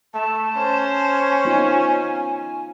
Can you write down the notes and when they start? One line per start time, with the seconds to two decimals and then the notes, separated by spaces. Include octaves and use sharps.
0.14 A3 A5
0.57 C#4 C5
1.45 B3 D#4 F4 G#5